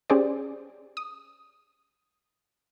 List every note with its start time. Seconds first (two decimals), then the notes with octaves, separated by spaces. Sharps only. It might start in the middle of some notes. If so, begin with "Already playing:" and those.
0.10 C#4 G4 G#4 C5 D5
0.97 D#6